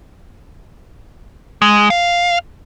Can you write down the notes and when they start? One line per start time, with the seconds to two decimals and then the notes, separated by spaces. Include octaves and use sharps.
1.62 G#3
1.90 F5